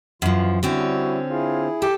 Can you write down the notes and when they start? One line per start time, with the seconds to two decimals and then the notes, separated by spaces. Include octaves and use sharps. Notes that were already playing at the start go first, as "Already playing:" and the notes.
0.22 F#2 E3 F3 F4
0.63 D3 G3 C4 C#4 E4 F#4
1.30 E4 F4 G#4
1.82 G4 A4